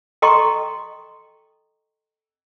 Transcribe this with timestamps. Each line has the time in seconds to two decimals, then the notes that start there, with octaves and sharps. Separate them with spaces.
0.22 A4 D#5 G5 A#5 C6 C#6